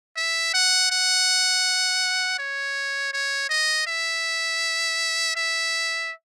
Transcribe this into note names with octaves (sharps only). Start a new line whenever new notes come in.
E5
F#5
F#5
C#5
C#5
D#5
E5
E5